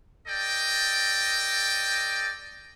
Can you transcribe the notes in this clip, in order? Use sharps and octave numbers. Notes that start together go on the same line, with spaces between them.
A4 D5 D#5 G5